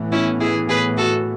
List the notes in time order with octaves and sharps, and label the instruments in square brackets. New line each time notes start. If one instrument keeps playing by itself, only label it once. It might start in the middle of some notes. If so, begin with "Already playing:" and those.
Already playing: [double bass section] A2 E3 B3
[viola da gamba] C#4 E4
E4 G#4
G#4 B4
F#4 A4